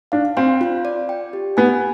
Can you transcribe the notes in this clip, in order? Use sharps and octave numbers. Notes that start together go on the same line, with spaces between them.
D4 F5
C4 F5
F4
D5
G5
G4
B3 G#5